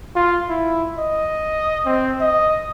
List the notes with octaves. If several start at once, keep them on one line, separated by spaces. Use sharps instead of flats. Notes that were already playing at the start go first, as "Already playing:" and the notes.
F4
E4
D#5
C4
D#5